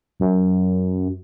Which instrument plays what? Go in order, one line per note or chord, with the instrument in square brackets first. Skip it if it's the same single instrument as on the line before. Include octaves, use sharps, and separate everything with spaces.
[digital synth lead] F#2